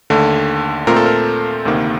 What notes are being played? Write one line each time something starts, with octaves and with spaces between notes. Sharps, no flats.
D#2 D3 A3
A#2 A3 C4 F4 A#4
A4
A#4
D2 C3 D#3 A#3